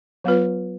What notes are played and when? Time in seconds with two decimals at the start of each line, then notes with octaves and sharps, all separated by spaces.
0.24 F#3 B3 F4 B4